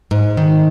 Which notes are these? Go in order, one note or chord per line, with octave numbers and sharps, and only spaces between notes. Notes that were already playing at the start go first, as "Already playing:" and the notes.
G#2
D#3